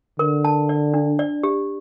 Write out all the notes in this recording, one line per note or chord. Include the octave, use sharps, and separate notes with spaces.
D3 A#4
A5
D5
D4
D5
G4